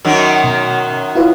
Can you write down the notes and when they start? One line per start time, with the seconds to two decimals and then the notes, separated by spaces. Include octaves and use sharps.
0.04 F#2 D#3 F#3
0.44 B2
1.15 E4 F4 B4